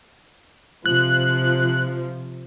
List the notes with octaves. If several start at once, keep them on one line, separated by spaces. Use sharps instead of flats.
C3 F3 F#6